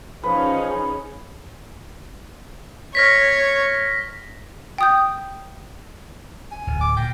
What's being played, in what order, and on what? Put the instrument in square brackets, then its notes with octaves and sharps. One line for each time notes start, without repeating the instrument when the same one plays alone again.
[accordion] F3 [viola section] C#4 D#4 G#4 [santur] B4
[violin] C#5 [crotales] F6 A#6 B6
[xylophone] G5 D#6 G6
[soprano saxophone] G#5
[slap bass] D1
[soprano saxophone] D6
[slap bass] A#2 [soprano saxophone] G5